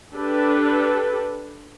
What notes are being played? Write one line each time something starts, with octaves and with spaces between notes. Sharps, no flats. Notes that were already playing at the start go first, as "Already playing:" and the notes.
D4 G4 A4 B4